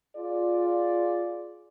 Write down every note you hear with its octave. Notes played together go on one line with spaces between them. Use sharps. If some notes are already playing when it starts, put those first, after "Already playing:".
F4 G#4 D5